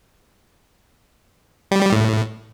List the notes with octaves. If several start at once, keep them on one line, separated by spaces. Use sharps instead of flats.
G3
G3
A2